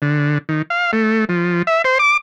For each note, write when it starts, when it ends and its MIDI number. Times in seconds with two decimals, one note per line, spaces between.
0.02 0.38 50
0.49 0.62 51
0.70 0.91 77
0.93 1.25 57
1.29 1.62 53
1.67 1.82 76
1.84 1.98 72
1.99 2.17 86